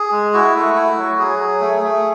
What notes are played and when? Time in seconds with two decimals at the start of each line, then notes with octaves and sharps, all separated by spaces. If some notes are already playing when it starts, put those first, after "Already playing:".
Already playing: G#4
0.12 G#3
0.33 E4 F#4
0.55 A3
0.75 E4
0.97 F#3
1.19 F#3 G#4
1.40 F#3
1.61 A3
1.83 A3